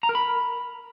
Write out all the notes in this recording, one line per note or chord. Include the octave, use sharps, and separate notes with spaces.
A#5
A#4
B5